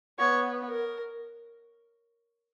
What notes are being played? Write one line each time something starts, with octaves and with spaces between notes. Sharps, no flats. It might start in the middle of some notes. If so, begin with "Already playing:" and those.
B3 C#5
A#4